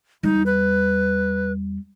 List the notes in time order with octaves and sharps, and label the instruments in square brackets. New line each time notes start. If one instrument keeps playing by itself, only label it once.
[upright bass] E2 G3 [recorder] D#4
[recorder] B4